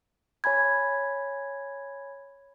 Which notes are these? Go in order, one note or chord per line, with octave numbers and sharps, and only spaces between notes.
C#5 G#5 B5 G#6